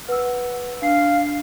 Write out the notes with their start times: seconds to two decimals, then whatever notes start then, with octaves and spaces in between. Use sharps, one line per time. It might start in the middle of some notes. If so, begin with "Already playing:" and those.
0.09 B4 F#5 E6
0.82 D4 F5 C7